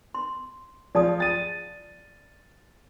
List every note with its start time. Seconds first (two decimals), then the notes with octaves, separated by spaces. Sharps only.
0.15 C6
0.95 F3 G#4 D5 A5 D#6
1.20 A6 D#7